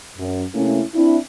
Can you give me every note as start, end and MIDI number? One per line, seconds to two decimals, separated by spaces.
0.18 0.43 42
0.54 0.81 48
0.54 0.81 57
0.54 0.81 58
0.54 0.81 61
0.54 0.81 64
0.94 1.17 60
0.94 1.17 62
0.94 1.17 64